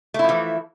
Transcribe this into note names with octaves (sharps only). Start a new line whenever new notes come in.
E3 F3 A3 E4